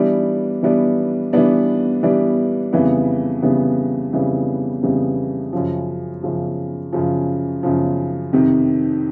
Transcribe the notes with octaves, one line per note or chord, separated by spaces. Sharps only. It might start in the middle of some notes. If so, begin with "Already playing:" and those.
Already playing: E3 G3 B3 D4
E3 G3 B3 D4
E3 G3 B3 D4
E3 G3 B3 D4
F2 C#3 E3 G3 B3
F2 C#3 E3 G3 B3
F2 C#3 E3 G3 B3
F2 C#3 E3 G3 B3
F#2 C#3 F3
F#2 C#3 F3
F#2 C#3 F3
F#2 C#3 F3
F2 C3 D#3